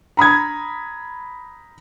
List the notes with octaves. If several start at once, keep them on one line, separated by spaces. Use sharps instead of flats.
A#5 B5 D#6 G#6